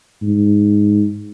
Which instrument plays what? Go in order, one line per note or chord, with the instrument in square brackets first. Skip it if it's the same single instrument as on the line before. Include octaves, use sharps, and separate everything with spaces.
[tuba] G#2